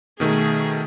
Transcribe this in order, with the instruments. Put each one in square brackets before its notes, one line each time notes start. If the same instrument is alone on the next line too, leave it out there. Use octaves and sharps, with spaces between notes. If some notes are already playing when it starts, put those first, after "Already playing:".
[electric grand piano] B2 D#3 A3 [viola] G#4